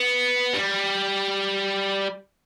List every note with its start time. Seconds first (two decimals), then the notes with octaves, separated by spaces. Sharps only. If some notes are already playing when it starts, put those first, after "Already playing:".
Already playing: B3
0.54 G3